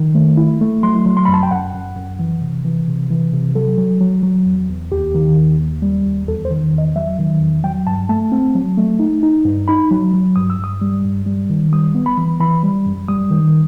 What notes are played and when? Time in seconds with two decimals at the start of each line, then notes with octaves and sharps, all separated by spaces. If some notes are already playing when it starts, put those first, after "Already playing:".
Already playing: D#3
0.15 A3
0.37 E4
0.61 A3
0.83 F#3 C6
1.06 F#3
1.17 C6
1.25 F#2 B5
1.34 A5
1.43 G5
1.51 F#2 F#5
1.74 F#2
1.97 F#2
2.19 E3
2.42 C3
2.65 E3
2.88 C3
3.10 E3
3.33 C3
3.55 F#3 A4
3.78 F#3
4.01 F#3
4.23 F#3
4.46 E2
4.69 E2
4.92 D#2 G4
5.15 D#3
5.37 D#2
5.59 D#2
5.82 G3
6.05 D#2
6.27 E2 A4
6.45 C5
6.50 D#3
6.73 E2 D#5
6.96 F#3 E5
7.19 D#3
7.41 E2
7.64 F#3 G5
7.87 G2 A5
8.09 A3 A5
8.32 C4
8.55 F#3
8.77 A3
8.99 D#4
9.23 D#4
9.45 G2
9.68 D#4 B5
9.91 F#3
10.14 F#3
10.36 G2 D#6
10.50 E6
10.59 G2 D#6
10.81 G3
11.04 G2
11.26 G3
11.50 D#3
11.73 G3 D#6
11.95 B3
12.06 B5
12.17 E3
12.40 E3 B5
12.63 G3
12.86 F#2
13.08 G3 D#6
13.31 D#3